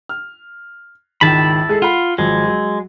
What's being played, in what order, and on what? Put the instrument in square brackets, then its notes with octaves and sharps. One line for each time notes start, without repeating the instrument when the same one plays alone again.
[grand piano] F6
[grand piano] G#1 C#2 D#3 [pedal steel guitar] E4 A5 B5
[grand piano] G#3 G#4 A4
[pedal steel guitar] F4 [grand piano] F#5 B5
[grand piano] G#1 F3 F#3 [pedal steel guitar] G#3
[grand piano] F#3